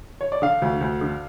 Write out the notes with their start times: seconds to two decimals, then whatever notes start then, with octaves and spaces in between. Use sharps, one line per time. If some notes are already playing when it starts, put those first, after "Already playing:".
0.21 C#5
0.32 D5
0.42 D3 F5
0.62 D2
0.81 D2
1.01 D3